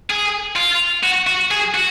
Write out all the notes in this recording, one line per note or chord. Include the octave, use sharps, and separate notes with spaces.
G#4
F4
F#4
F#4
G#4
F#4